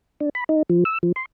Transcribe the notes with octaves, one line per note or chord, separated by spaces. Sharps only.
D4
B5
D#4
F3
E6
F3
C6